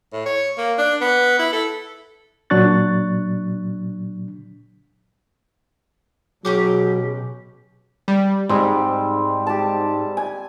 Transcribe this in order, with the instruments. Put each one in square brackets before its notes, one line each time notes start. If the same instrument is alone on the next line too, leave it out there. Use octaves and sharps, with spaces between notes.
[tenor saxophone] A2
C#5
A#3
D4
B3
E4
A4
[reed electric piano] A#2 F#3 D4 C#6 F#6 A6
[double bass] B2 [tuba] F#3 [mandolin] C#4 G4 D6 [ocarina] G#4
[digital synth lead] G3
[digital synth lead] G#2 [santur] G3 C4
[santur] G4 A5
G#5